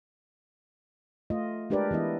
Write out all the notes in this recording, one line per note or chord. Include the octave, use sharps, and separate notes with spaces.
A3 F4 D#5
G#3 D4 G4 A#4 B4 D5
E3 B3 E4 D#5